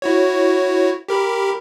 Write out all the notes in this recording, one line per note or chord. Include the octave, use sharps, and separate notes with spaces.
E4 F#4 C#5
G4 A#4 B5